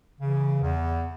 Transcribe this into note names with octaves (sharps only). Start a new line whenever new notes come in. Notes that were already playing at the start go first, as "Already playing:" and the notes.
C#3 E3
E2